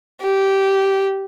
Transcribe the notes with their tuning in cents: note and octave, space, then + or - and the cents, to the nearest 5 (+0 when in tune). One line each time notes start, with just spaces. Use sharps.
G4 -15